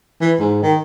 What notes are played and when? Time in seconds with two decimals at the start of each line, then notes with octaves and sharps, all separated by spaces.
0.21 E3
0.39 G#2
0.63 D#3